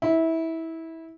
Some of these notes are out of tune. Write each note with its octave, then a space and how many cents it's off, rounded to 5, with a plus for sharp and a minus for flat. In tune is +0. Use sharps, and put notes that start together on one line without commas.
E4 -20